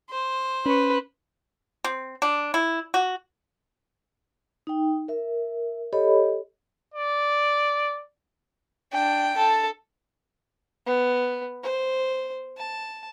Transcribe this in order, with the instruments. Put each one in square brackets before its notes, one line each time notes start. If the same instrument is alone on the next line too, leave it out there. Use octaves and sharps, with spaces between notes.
[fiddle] C5
[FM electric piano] C#4 C#6 [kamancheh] B4
[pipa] C4
D4
E4
F#4
[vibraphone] D#4 G5
A#4 E5
G4 A4 C#5 D#5 B5
[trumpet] D5
[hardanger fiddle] D4 [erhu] G5
[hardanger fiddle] A4 A5
B3
C5
A5